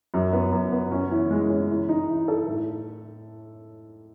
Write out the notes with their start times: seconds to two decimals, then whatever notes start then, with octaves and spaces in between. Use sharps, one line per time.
0.14 F#2
0.33 B3
0.52 F#2
0.72 B3
0.91 C#4
1.11 E3
1.31 G#3
1.50 C#4
1.70 E3
1.89 D#4
2.09 E3
2.28 A4
2.48 A2